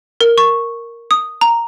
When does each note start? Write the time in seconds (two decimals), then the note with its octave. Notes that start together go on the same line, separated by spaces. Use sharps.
0.21 A#4
0.38 C#6
1.11 D#6
1.41 A#5